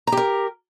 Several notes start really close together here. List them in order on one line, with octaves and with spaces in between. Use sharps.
A#5 G4 A#4